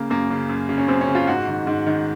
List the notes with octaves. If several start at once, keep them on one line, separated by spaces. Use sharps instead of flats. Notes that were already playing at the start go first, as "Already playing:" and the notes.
Already playing: C#3 A#3
F#2 A#3
C#3
F#2
C#3
C#4
F#2 C4
C#4
C#3
F4
G#2 F#4
D#3
G#2
D#3